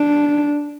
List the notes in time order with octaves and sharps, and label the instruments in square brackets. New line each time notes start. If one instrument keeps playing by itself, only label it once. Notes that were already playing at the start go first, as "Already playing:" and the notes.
Already playing: [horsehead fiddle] D4